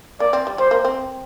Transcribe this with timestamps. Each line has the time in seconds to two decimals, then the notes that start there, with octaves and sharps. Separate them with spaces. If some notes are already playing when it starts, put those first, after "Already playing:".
0.20 A#3 D5
0.33 C4
0.47 G3
0.58 G3 C5
0.71 A#3
0.85 C4